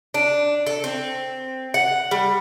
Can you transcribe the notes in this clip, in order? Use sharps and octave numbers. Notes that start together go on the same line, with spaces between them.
D4
A4
C4
F#5
G3